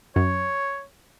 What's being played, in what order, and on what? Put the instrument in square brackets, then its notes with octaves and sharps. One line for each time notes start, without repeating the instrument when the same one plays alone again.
[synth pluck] F#2 [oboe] C#5